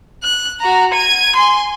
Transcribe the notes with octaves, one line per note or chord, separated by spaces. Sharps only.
F#6
F#4 A#5
G#6 D#7
G#5 C6